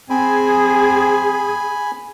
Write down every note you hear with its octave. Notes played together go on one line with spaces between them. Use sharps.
C4 G#4 G#5 B5